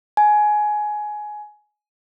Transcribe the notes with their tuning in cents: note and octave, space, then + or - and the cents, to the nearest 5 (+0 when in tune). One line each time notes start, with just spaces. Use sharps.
G#5 +15